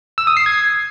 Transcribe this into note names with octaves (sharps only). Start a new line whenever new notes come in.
E6
D#6
C7
G#6